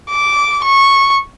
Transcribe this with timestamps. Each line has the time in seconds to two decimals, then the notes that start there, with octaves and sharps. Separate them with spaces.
0.11 D6
0.64 C#6